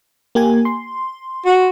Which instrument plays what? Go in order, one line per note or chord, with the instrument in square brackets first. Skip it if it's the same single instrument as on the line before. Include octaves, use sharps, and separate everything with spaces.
[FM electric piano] A#3 G4 G#5
C6
[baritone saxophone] F#4